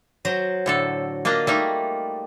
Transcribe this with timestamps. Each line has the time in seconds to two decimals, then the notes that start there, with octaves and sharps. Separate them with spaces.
0.25 F#3 C5 A#5
0.66 A2 D3 A4
1.25 A#3 D4 F4 D#5
1.47 G3 A3 A#3 D#4